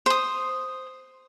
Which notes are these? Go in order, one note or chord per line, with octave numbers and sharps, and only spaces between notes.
C5 D#6